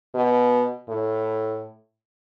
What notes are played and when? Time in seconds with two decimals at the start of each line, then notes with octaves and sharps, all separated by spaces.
0.15 B2
0.89 A2